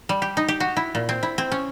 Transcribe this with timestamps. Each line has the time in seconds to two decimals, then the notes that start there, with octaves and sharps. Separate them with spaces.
0.09 G3
0.22 G4
0.37 D#4
0.48 G4
0.60 F#4
0.77 E4
0.95 A#2
1.09 C4
1.23 E4
1.38 C4
1.52 C#4